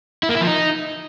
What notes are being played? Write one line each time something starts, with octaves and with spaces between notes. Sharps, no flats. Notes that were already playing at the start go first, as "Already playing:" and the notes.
E4
A#3
E4
F3
D#4